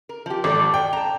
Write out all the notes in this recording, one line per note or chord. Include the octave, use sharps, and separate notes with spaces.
A#4
F3 G4
G#1 A4 D5
G5
A5 A#5